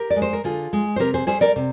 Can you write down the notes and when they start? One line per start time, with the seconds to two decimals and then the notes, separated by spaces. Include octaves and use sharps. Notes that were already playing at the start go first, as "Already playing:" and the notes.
Already playing: G4 A#4
0.10 D5
0.16 G#3
0.22 C5
0.33 A#4
0.44 D3 F4 G#4
0.73 G#3
0.96 C5
0.99 C3 G4 A#4
1.14 G#4 C5
1.27 G3 G#4 C5
1.41 A#4 D5
1.56 C3